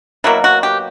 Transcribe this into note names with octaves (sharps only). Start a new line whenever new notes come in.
B2 F#3 A#3 E4
F#4
G4